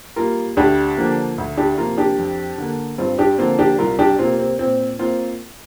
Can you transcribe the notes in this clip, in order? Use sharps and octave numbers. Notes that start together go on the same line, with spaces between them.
G3 A#3 F4 A#4
D2 D4 G4
D3 F3 A#3
D2
D4 G4
C3 F3 A#3 F4 A#4
D4 G4
F2
D3 A#3
G2 C4 F4
D4 G4
D3 F3 A#3 C4 F4
D4 G4
C2 F4 A#4
D4 G4
C3 A#3 C4 F4
C4
A#2 C4
A#3 C4 F4